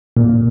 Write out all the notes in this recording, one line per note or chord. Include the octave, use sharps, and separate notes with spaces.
A#2